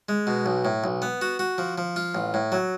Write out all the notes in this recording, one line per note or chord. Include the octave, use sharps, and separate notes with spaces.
G#3
B2
B1
A2
B1
B3
F#4
F#4
F3
F3
F4
A1
A2
F#3